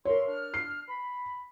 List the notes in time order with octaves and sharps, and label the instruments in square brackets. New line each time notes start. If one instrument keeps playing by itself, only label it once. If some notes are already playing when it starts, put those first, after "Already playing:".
[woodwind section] E2 E5 C6 [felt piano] A#4 C#5
[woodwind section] D4 F6
[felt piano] C7
[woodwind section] B5